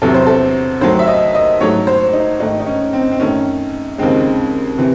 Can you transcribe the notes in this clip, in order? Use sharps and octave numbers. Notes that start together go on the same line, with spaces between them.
E2 C3 F#3 A4
C5
A4
D#2 D#3 F#3 A3 C5
E5
D#5
D#5
G#2 F#3 A3 C#5
C5
D#4
G#2 D#3 A3 D#4
D#4
C#4
C4
C4
F#2 D#3 A3 C#4
D#2 C#3 G#3 C4
C3 E3